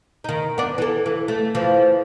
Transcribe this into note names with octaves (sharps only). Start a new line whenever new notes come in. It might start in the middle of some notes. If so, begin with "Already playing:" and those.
D#3 D#4
B3 D4
E3 A4
E3
A3
E3 F3